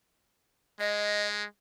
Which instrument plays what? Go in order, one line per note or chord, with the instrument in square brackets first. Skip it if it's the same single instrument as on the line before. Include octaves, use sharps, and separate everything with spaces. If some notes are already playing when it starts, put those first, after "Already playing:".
[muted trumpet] G#3 [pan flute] D#5